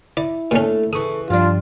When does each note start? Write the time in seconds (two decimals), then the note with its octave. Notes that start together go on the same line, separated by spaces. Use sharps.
0.17 E4 D5
0.51 A#2 A3 C#4 D4 A4
0.93 C#3 E3 A4 C#6 D#6
1.30 G2 F3 G3 D4 F4